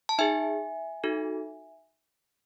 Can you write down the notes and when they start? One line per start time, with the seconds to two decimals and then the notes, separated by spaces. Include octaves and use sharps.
0.09 A5
0.19 D#4 G#4 E5 G#5
1.04 D#4 F#4 A4